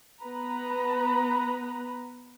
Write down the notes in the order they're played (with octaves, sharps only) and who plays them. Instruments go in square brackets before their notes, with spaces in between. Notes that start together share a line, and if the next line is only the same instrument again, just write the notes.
[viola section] B3 B4 A#5 B5